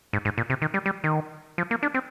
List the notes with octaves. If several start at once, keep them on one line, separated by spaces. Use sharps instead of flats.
G#2
G#2
A#2
C3
D#3
G3
G3
D#3
F3
A#3
D4
C4